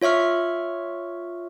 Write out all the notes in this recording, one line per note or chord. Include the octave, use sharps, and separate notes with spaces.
F4 C#5 E5 C#6 F6